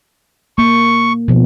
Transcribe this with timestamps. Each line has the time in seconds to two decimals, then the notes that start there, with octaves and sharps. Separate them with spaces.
0.58 A#3 C#6
1.28 B2 F3